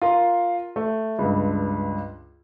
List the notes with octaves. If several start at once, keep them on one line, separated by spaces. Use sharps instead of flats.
F4 A#4 C6
A3
C#2 G2